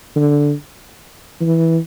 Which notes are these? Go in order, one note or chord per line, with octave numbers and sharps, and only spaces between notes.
D3
E3